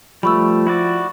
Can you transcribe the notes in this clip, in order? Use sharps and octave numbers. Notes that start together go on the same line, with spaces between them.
F3 G3 A3 B5 C#6 E6
E4 F#4 D5